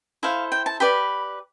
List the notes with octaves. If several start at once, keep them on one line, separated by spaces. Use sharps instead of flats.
E4 A4 C5 F5
G5
A5
G4 B4 D5 B5